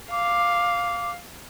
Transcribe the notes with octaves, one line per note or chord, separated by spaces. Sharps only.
F5 D6